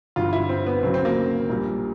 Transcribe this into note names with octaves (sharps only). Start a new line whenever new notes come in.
G1 G2 E3 F4
E4
C4
B3
D2 C#3 F#3 C4
C4
A#3
A#1 A#2 G3